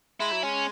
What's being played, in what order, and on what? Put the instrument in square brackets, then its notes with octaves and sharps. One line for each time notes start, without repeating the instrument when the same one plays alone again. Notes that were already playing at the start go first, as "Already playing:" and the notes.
[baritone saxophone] G#3 [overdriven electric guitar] E4
[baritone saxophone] F#3
[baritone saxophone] G#3 [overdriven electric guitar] C#4